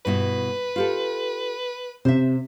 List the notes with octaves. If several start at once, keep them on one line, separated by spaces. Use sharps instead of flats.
G2 B2 E4 B4
F4 G4 A4
C3 C5 E5